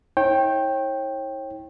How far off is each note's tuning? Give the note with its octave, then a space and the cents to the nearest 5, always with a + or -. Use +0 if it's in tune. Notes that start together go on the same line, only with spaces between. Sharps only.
E4 -45 C#5 -40 G5 +0